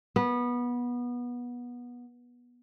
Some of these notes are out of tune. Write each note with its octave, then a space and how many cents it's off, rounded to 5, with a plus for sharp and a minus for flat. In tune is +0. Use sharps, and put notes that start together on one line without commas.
B3 -20